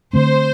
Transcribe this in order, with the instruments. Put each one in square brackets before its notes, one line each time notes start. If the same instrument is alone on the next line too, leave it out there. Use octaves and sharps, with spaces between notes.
[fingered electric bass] D3 A3 C4 [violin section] C5